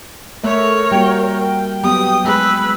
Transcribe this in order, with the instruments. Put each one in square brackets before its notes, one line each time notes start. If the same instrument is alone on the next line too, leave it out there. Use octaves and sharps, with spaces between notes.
[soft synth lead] A3 [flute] A#4 [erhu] C#5 [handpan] E5
[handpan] G3 A#3 F#4 [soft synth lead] G5
[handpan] F#3 B3 [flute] G4 [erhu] D#6
[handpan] G#3 G#4 [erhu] B4 [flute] E6